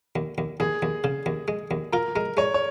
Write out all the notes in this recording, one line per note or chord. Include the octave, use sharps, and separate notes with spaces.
D#2
D#2
D#2 G#4
D#2
C#3
D#2
G#3
D#2
F4 A#4
G#3 A#4
G#3 C#5
C#5